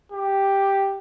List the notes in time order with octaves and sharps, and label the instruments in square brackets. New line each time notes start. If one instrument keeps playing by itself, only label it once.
[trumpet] G4